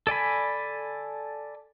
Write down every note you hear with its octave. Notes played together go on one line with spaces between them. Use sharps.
A4 D5 G#5 B5